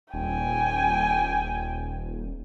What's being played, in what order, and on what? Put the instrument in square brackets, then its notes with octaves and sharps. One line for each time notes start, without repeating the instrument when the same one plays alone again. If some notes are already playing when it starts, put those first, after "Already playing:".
[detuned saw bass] D#1 [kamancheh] G5 G#5